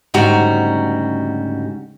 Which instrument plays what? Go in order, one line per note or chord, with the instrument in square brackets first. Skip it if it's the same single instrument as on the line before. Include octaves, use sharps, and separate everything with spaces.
[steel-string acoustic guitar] D2 G#2 C#3 G3 F#4 A#5